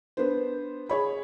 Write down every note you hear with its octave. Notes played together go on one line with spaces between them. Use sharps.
B3 D4 C5
G#4 C#5 B5